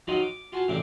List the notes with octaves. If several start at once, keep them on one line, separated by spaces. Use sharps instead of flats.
D#3 F#3 D#4 F4 F#4 D#5
D6
F4 F#4 G#5 A5
A1 A2 C3 C4 D4 D6